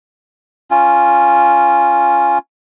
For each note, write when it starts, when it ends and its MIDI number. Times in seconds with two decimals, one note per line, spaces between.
0.71 2.38 61
0.71 2.38 65